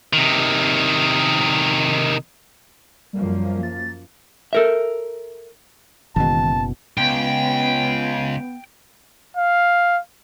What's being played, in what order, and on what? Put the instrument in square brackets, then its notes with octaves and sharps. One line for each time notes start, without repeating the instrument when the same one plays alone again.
[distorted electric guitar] C3 D#3
[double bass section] F#2 F3 A#3 [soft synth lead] G3
[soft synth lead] A6
[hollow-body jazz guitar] A4 A#4 E5
[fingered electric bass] F#1 B2 [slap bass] D#3 E3 G#3 [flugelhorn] A5
[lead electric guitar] C#2 [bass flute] B3 [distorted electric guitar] G5
[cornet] F5